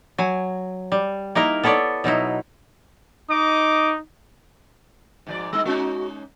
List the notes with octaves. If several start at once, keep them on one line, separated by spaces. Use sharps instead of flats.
F#3 G#5
G3
A#3 D#4 E4 A#4
B3 A4 B4 C#5 D5
B2 F#3 D#4 E4
D#4 D#5 D6
G#2 F3 D5
G3 D#4 E6
G#3 C#4 D#4 F#4